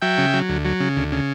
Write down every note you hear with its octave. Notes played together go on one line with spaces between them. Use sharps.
F#3 E5 G5
C#3
F#3
D2
F#3
C#3
D2
C#3